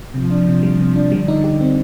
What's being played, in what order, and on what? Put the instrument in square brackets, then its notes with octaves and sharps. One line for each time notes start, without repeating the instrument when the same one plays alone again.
[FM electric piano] C3 [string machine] F3
[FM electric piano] D4
C3
G3
C3
D4
[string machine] D3 [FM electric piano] G3
[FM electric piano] D#4
G4
C4